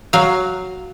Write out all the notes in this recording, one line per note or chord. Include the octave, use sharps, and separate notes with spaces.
F#3 F5